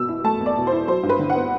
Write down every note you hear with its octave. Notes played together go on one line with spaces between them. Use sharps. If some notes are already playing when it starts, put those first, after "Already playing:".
Already playing: B2 E6
E4
A3 A5
E2
D5
B2
C5
E4
F#3 C5
G2
B4
D3
F#5
B3